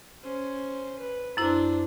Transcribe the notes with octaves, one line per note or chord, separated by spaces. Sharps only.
C#4 C5
B4
F#2 D4 E4 C5 E6